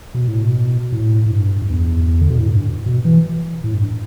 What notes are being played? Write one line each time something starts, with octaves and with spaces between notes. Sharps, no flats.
B2
A2
B2
A2
A2
G2
G2
E2
D3
B2
A2
G2
B2
E3
A2
G2